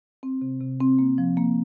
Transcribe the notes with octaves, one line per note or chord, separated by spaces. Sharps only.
C4
C3
C3
C4
A#3
F3
A#3